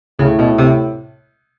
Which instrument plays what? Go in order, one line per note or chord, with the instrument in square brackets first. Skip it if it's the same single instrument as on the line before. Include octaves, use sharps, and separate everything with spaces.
[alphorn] A2 [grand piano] C#3
[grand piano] B2
C3